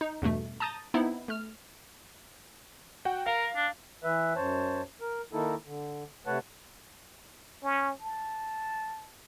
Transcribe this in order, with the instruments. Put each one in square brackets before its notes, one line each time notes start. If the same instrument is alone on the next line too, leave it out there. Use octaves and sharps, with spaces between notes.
[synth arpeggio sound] D#4
E2 G2 B2 A3
A5 A#5 D#6 G6 A6
B3 C4 D#4 E4
A3 F6
[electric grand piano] F#4 F#5 G5
[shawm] A#4 [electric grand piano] F5
[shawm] D4
[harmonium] E3 B4 E5
F#2 C5 C#5 A5
A#4
D#3 A#3 D#4 E4 A4
D3
C3 A3 B4 C#5 F#5 A5
[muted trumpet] C#4
A5